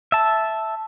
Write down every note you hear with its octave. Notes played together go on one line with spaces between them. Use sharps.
E5 A5